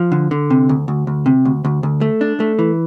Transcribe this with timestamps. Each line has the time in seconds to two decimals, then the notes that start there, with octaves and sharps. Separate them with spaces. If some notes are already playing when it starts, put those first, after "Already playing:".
Already playing: F3
0.12 D3
0.31 D3
0.50 C3
0.69 D2
0.88 D2
1.07 D2
1.26 C3
1.45 D2
1.65 D2
1.83 D2
2.01 A3
2.21 D4
2.40 A3
2.59 E3